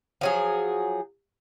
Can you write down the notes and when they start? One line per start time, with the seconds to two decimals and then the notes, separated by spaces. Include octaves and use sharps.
0.21 F3 F#3 G#4